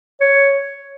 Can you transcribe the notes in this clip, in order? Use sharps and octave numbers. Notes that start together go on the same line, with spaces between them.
C#5